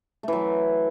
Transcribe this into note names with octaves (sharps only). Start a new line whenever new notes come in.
E3 F#3 A3